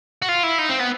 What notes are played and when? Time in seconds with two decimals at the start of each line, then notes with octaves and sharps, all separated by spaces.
0.22 F#4
0.29 F4
0.43 E4
0.59 D#4
0.70 C4
0.81 B3